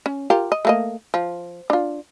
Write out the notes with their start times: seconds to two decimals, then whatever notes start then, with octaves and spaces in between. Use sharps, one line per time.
0.06 C#4
0.30 F4 G4 A#4
0.52 D#5
0.65 A3 A#3 D#5
1.14 F3
1.70 D4 F4